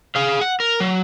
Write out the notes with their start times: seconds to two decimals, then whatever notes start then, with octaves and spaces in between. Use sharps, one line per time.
0.16 G#4 F5
0.41 F#5
0.60 A#4
0.80 F#3